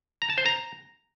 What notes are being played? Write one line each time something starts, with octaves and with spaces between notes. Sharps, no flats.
A#5
A5
C5
A#5